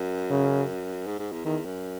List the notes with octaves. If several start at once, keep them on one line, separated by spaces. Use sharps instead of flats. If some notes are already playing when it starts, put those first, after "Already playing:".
Already playing: F#2
C#3
G#2
G#2
E2
E2 D#3
F#2